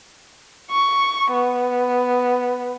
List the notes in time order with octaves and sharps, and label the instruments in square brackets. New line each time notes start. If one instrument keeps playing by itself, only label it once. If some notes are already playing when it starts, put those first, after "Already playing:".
[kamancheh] C#6
B3